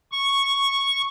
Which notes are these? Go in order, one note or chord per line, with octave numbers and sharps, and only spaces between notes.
C#6